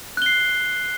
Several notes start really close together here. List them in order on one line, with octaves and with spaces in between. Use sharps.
F#6 G7 C7